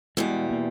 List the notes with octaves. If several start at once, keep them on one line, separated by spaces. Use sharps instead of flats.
E2 B2 G3 G#3
A#3